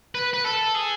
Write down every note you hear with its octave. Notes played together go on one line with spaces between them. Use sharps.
B4
B4
A4
G#4